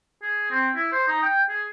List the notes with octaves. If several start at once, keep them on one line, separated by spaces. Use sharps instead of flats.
G#4
C4
E4
C5
D#4
G5
G#4